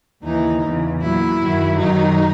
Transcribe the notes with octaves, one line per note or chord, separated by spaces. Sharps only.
D#2 C#3 E3 D#4
E2 C#3 E3
A#2 F#3 E4
F#2 D#3 F#3
F#2 D#3 F#3 D#4